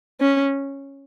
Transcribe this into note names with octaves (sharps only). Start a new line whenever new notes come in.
C#4